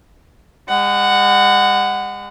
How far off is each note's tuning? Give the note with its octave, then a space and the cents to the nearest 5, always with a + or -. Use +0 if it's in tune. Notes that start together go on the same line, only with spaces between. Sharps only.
G#3 -45 F#5 +0